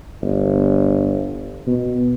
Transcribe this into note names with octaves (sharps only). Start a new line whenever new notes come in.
G1
B2